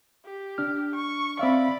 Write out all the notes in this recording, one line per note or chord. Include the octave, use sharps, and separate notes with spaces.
G4
D4 F6
C#6
C4 D5 E5 F5 B5